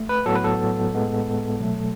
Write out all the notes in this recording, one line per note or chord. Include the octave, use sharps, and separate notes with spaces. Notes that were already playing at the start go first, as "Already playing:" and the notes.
Already playing: A3
B4
A2 F#3 B3 A4
B4
A4
A2 G#3 B3
B2 F#3 A3